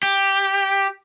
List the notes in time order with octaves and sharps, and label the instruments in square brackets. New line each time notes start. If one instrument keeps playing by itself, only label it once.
[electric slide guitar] G4